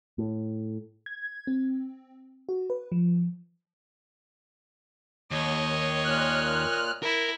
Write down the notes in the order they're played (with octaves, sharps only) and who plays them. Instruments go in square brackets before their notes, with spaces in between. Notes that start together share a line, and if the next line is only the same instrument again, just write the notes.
[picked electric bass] A2
[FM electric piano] G#6
C4
F#4
B4
F3
[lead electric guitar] D#2 [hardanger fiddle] C#5 D#5
[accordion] A#2 F6 F#6
[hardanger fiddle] E4 [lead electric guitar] A#4